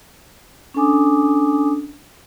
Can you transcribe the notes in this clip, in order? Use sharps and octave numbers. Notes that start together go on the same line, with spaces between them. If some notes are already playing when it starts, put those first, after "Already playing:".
C#4 D4 A4 G#5 D6 D#6